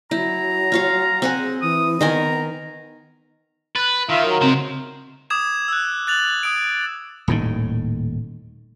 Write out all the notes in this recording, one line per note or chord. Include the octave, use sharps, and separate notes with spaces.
F#3 E4 A#5
F4 C#5 F5
C4 F#5 G#5
G#4
E3 D#6
D#3 B3 A#4 G#5 A#5
B4 F#6 A6
D#3 F4 E5 F5
F#3 A#4
C#3 G#3 C4 C5
D6 D#6 G#6 E7
E6 F#6
F#6 A6 F7 F#7
D#6 D7
D#1 A2 D#3